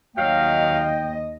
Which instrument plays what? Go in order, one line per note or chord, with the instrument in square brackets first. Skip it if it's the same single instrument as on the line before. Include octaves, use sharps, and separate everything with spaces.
[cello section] D#2 D#5 [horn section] F#3 F5 [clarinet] G5